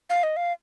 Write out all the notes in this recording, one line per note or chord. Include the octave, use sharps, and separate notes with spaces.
F5
D#5
F5